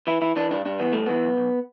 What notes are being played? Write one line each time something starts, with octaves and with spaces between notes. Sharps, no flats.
E3 E4
E3 E4
E3 D4
G2 D4
G2 D4
E3 B3
G2 A3
E3 B3
B1
B1